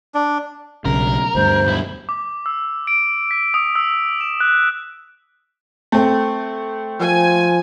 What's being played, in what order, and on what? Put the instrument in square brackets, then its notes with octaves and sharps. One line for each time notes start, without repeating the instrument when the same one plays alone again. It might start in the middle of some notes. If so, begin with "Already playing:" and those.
[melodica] D4
[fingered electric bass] B1 C#3 [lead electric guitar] A#4
[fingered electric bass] D2 G2 [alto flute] C5
[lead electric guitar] B1 E4
[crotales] D6
E6
D7
B6
D#6
E6
E7
F#6
[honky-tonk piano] A3 C4
[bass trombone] F3 [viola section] G#5